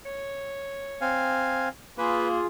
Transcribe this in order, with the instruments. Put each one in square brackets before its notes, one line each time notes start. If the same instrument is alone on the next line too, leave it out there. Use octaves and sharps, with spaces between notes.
[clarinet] C#5
[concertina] C4 F5 G#5
[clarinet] A#3 [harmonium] F4 G#4 [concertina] B4